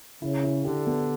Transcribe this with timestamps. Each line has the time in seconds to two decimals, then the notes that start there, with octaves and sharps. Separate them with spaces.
0.22 C#3 E4
0.43 E4
0.65 D3 G4
0.87 B3